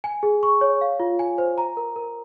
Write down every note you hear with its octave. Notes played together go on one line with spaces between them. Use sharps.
G#5
G#4
C#6
C#5
F5
F4
G#5
C5
A#5
A#4
A#4